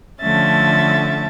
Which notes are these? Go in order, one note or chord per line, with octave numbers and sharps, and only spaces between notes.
D3 F3 A3 C#4 E5 A6